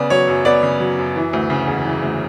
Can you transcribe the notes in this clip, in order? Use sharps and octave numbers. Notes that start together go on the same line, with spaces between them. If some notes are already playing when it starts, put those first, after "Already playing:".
Already playing: C#3 B3 D5
F#3 C#5
F#2
B3 D5
C#3
F#3
F#2
E3
D2
C#3
E1
E3
D2